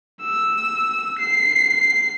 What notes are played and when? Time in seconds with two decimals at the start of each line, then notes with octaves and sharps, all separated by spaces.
0.22 E6
1.19 C7